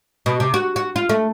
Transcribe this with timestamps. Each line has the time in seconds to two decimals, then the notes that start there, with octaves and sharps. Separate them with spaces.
0.26 B2
0.40 C3
0.54 F#4
0.76 F#4
0.96 F4
1.09 A3